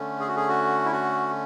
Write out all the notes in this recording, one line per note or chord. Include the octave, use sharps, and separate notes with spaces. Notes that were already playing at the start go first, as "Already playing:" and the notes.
Already playing: D3 A3 C#4
G#4
F#4
G#4
F#4
E4
F#4